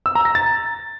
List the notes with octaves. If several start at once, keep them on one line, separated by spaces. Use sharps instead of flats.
E6
A#5
A#6
A6